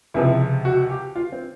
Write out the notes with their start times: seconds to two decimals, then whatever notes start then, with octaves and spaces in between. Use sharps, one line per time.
0.14 C#2 C3 F3 E4
0.65 F#4
0.90 G4
1.16 F4
1.32 C4